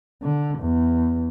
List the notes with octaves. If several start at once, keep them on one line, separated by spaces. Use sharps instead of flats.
D3
E2